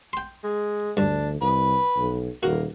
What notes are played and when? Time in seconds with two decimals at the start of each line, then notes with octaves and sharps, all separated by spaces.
0.13 G5 C6
0.44 G#3
0.97 D2 G2 D4
1.42 C2 B4
1.97 B1
2.43 D#1 A#3 F#4